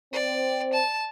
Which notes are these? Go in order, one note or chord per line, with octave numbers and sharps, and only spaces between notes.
C4 D5
A5